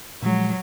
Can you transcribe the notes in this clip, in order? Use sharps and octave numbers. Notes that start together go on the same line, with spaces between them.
A#2 F3 F#3 G#3